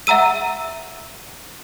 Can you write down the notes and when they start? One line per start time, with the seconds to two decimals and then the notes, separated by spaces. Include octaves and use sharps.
0.07 E5 F#5 A#5 E6 D#7